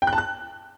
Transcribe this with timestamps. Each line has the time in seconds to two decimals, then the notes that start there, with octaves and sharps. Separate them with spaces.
0.02 G5
0.07 F#6
0.13 A5
0.18 F#6